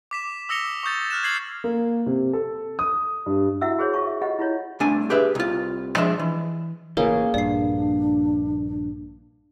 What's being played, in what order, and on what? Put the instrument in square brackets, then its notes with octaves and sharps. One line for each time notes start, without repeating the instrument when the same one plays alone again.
[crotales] D6 B6 E7
D#6 E6 A#6 C#7 F7 G7
C#6 D#6 G6 A6
F6 F#6 E7
F6 G#6 C7 F#7
[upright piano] A#3
C3
A4
D#6
G2
[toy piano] E4 F#4 E5 F#5 E6
F#4 G#4 C5 C#5
F4 A5 C#6
E5
F4 G4 D#5 F#5
E4 F4 C#5
[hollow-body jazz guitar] C2 A3 D4 G#5
G4 G#4 B4 E5
C2 F4
F3 G#3 D4 E5
E3
[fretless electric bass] A1 C#3 E3 [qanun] A#3 G#4 [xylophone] A#4 C#5
[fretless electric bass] A#1 G2 [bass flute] D4 [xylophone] D5 C7